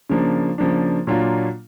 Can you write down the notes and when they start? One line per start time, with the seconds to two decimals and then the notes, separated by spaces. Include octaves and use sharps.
0.10 C#3 F3 A#3 D4
0.58 C#3 F3 A#3 D4
1.07 A#2 F#3 A#3 D4 F4